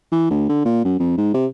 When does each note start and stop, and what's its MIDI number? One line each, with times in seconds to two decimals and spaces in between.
0.12 0.26 52
0.30 0.47 38
0.49 0.64 50
0.65 0.81 46
0.85 0.98 42
0.99 1.16 41
1.18 1.31 44
1.34 1.46 48